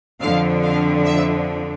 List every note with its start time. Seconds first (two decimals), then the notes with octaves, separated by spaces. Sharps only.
0.21 F2 D3 F3 F5
0.63 F5
1.06 E5